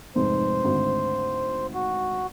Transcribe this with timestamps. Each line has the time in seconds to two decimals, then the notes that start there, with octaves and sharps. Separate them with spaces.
0.16 F1 G#2 C5
0.64 G#1 D2
1.74 F#4